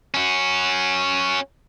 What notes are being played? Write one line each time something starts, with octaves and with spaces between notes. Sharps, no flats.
C#4 F#4